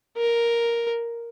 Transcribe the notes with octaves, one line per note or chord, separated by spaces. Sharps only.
A#4